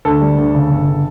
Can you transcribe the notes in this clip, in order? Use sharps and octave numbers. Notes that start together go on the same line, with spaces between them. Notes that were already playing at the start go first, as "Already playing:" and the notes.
D2 A4
G3
D2
C#3
G1
C#3